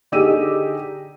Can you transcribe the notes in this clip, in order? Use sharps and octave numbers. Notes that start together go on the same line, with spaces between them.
D3 D#4 G4 G#4 E6 D#7